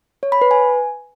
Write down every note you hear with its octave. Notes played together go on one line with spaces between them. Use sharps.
C#5
B5
B4
G#5